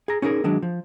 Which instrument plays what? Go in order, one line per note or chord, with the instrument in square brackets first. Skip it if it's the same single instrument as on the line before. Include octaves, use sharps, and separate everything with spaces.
[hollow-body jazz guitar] G#4 A#5
C#4 D#4 G#4 A#4
D#3 F#3 G#3 D4
F3